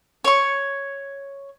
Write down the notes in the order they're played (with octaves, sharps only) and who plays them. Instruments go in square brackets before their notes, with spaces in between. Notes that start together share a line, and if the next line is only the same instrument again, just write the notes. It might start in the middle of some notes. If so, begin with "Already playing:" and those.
[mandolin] C#5 C#6